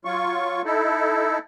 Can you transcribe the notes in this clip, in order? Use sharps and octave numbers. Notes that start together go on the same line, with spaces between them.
F#3 F4 C#6
D#4 E4 A4